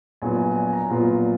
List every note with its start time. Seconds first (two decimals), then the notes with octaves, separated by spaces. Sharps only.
0.22 A#1 A#2 F#3 B3 F4 G#5
0.39 G#5
0.56 G#5
0.73 A#5
0.90 A#1 A#2 F#3 B3 F4